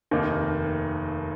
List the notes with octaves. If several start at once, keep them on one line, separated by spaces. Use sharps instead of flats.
F1 D#2 D#3 A#3 D#4